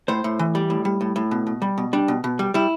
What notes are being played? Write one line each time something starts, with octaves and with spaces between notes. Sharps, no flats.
A2 C5
A2
E3
G3
A2
G3
A2
A2
B2
B2
G3
B2
G3 D4
B2
B2
G3
G3 E4